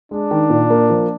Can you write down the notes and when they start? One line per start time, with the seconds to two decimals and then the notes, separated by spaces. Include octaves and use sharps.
0.11 G#3 D4
0.31 D#3
0.50 A#2
0.70 A#3
0.90 F3